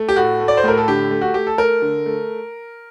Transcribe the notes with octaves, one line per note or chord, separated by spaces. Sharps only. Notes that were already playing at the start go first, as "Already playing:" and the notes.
Already playing: A3
G4
A2 F#4
A3
D5
C5
A2 A#4
A4
D3 G4
A3
F#4
A3 G4
A4
A3 A#4
D3
A3